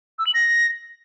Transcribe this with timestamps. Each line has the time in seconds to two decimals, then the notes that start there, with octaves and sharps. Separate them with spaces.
0.19 E6
0.27 F#7
0.34 A#6